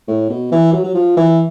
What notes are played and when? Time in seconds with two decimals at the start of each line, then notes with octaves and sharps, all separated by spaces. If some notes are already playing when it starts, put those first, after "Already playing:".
0.08 A2
0.30 B2
0.52 E3
0.73 F#3
0.84 F#3
0.95 F3
1.17 E3